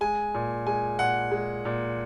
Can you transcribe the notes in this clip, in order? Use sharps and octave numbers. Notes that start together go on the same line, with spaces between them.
G#3 G#5
A#2
G#3 G#5
A#2 F#5
G#3
A#2